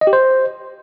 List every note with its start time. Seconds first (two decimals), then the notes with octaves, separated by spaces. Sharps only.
0.01 D#5
0.07 G4
0.13 C5